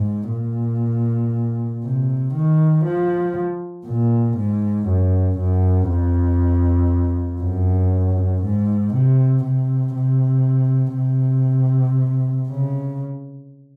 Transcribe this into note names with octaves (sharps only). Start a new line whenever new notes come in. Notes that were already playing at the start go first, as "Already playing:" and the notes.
Already playing: G#2
A#2
C3
D#3
F3
A#2
G#2
F#2
F#2
F2
F#2
G#2
C3
C3
C3
C3
C#3